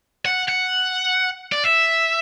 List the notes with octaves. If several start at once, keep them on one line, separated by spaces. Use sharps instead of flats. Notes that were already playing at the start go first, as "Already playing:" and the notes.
F#5
F#5
D5
E5